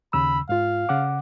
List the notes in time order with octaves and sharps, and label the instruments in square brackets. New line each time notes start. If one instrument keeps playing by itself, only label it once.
[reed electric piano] D#2 C#3 E6 [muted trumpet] B5
[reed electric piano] G#2 F4 [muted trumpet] F5
[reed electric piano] C#3 F#5 D6